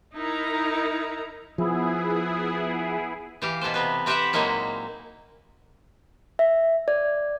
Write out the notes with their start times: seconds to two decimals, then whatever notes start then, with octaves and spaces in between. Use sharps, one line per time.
0.16 D#4 E4 A#4 A#5
1.58 F3 B3 E4 G#4
3.42 E3 G4 F5
3.61 B2 A4 B4 C5
3.74 C3 B3 B4
4.06 C4 G4 B4 C5 E5 F#5
4.33 A#2 F#3 G#3 A#3 D#4 E4
6.39 E5
6.88 D5